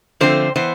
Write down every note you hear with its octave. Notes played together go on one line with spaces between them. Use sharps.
D3 F3 A3 C4 C5
E3 B3 C5